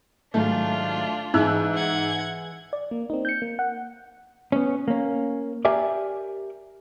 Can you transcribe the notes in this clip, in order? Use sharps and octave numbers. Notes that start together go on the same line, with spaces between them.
G#2 D#3 F#3 A3 D4 F4
G#2 E3 D#4 G#4 E5 E6 F#6
F#5 G#6
D5
A#3
C4 D#4
G6 C#7
A#3
F#5
B3 C#4
A#3 C#4
G4 A#4 D5 E5 G#5